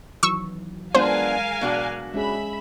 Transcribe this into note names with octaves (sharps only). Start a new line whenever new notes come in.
D#3 E3 F#3 C#6 E6
G#3 B3 D4 F4 A#4 C5 F5 G#5
B2 D4 F#4
G#3 C#4 G#4 E5 B5